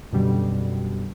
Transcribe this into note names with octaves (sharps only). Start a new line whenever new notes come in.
F#2 B2 D3 G3